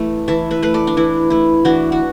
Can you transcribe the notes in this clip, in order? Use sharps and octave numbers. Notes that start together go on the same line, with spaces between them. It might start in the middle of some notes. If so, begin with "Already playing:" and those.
Already playing: E3 A3
E3 E5 A5
B4 E5
A3 B4
A4 D5
D4
E3 E4
A3 E4
E3 D4 F#4
F#4